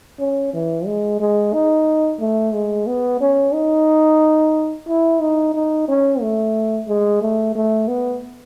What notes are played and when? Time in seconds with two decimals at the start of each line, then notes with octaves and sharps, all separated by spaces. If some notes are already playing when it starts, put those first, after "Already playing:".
0.19 C#4
0.53 E3
0.86 G#3
1.20 G#3
1.54 D#4
2.20 A3
2.54 G#3
2.87 B3
3.21 C#4
3.54 D#4
4.88 E4
5.21 D#4
5.55 D#4
5.88 C#4
6.21 A3
6.88 G#3
7.22 A3
7.55 A3
7.88 B3